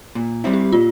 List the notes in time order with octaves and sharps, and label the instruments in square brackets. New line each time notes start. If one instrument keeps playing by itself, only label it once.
[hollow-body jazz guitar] A#2
G3 C4 E4
[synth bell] G4
[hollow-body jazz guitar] A#2 [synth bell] F4